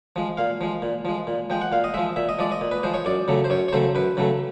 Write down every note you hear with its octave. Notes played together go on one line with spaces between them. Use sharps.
F3 G#3
A#2 F5
F3 G#3
A#2
F3 G#3
A#2
F3 G#3 G5
F#5
A#2 F5
D#5
F3 G#3 E5
A#2 E5
D#5
F3 G#3 D5
D#5
A#2
B4
F3 G#3 C5
C#5
F#2 D5
C#3 F#3 A3
C5
F#2 C#5
C#5
C#3 F#3 A3 C5
F#2 B4
C#3 F#3 A3